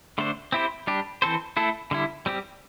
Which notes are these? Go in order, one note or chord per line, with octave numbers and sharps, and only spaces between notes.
D3 A3 D4 C5
C4 E4 G4 C5
G3 D4 G4
E3 C4 A4 C5
A3 E4 A4
D3 G3 E4
G3 C4 G4